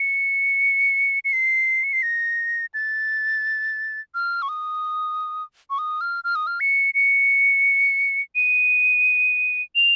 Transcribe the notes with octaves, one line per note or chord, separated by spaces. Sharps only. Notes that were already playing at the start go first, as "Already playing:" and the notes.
Already playing: C#7
C#7
C7
C#7
C7
A#6
A6
F6
C#6
D#6
C#6
D#6
F6
F6
D#6
F6
C#7
C#7
D#7
F7